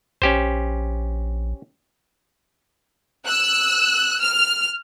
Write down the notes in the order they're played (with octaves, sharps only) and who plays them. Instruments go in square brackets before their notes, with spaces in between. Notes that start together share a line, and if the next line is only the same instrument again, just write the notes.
[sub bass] A#1 [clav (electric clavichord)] C#4 G4 C5
[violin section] E6 F#6
F6